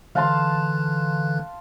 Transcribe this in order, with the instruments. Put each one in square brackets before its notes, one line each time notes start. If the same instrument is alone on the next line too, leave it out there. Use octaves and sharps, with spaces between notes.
[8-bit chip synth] D3 E3 F#6 [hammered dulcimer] F5 A5 C6